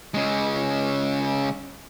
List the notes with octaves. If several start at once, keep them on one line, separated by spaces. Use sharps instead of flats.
C#3 G#3